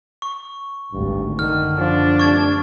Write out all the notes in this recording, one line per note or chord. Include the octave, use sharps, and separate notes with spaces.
C#6
G#1 D2 G2
F#2 D3 D#3 F6
F3 D4
F1 C#6 G#6